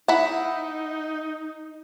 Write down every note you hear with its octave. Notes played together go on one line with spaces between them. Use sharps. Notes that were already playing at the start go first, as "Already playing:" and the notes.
D#4 E4 F#5